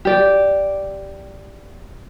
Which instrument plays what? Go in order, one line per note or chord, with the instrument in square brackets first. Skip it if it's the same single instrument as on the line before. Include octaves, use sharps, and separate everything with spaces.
[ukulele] G4 D5